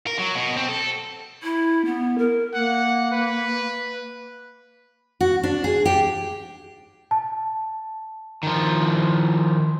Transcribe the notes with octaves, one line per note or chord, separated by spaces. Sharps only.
A#4
F#3
B2
C4
A4
E4
B3
A#4
A#3 F#5
B4
F#4
D4
G#4
G4
A5
D#3 F3